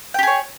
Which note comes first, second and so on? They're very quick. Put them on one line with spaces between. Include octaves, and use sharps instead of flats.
G5 G4 G#4 C#5